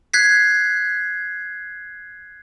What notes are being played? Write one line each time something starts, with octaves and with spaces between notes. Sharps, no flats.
F#6 G#6 B6 C7